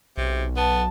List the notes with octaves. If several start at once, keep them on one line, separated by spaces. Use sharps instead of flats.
B1 C3
B3 A5